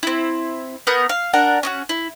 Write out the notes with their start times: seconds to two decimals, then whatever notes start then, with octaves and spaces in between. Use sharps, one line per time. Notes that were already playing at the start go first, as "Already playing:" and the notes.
0.03 C4 E4
0.87 B3 A#4 F#5 G6
1.09 F5
1.33 D4 A#4 F#5
1.63 C#4 D#4 F#4
1.89 E4